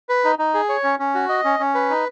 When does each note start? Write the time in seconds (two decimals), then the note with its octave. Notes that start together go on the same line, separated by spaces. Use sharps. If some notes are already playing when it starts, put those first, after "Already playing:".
0.09 B4
0.24 D#4
0.39 D#4
0.54 G#4
0.69 C#5
0.84 C#4
0.99 C#4
1.15 F#4
1.29 D#5
1.44 C#4
1.59 C#4
1.75 B4
1.90 D#4